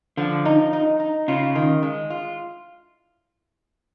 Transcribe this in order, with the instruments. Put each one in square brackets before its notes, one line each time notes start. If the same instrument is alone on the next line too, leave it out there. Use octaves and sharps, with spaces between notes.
[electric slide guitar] D3 [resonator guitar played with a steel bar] F3
[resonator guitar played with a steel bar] D#4
D#4
D#4
[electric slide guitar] C#3 [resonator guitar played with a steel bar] F4
[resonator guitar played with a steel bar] D#3
G#3
F4